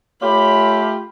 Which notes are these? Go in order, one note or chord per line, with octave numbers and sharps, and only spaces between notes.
A3 F4 G4 C#5 B5